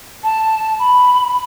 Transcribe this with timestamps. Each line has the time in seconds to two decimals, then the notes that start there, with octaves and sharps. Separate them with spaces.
0.24 A5
0.79 B5